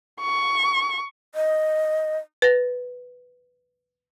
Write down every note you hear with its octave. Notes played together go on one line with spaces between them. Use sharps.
C#6
D#5
B4 A#6